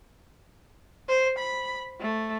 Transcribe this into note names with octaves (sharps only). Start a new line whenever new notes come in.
C5
B5
A3